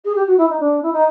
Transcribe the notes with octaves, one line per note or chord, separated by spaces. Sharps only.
G#4
G4
F#4
E4
D#4
D4
E4
D#4